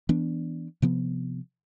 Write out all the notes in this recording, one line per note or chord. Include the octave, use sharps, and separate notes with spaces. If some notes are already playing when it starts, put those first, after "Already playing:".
E3 B3 D4
C3 F3 B3